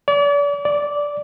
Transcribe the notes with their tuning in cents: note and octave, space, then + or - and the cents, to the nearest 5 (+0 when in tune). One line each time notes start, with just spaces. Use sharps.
D5 -40
D5 -10